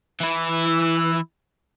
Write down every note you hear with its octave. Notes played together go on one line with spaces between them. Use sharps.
E3 E4